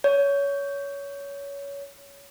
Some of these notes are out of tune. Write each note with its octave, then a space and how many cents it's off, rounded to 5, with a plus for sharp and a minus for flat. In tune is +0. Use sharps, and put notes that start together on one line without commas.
C#5 +20